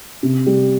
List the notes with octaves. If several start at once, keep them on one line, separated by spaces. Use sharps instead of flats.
C3
G3